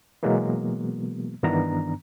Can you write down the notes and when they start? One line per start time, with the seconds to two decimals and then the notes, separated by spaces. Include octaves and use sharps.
0.23 B2 E3 F#3 G#3 A#3 B3
1.43 G2 D#3 E3 B3 D4 A#5